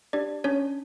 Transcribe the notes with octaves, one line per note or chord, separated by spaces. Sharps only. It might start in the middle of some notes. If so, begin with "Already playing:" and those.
D4 G4 D5
C#4 D4 C#5